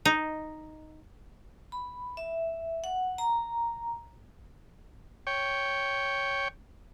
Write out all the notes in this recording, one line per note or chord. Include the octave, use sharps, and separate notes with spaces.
D#4
B5
E5
F#5
A#5
C#5 G5